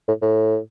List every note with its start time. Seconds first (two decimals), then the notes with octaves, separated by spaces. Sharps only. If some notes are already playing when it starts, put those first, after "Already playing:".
0.08 A2
0.22 A2